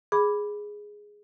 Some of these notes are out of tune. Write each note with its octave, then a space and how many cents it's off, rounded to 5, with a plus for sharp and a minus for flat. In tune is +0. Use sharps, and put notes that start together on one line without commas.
G#4 +0 B5 +0 D6 +0